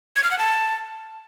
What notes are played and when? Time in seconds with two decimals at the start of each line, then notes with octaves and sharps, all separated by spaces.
0.16 G#6
0.24 F6
0.31 F#5
0.39 A5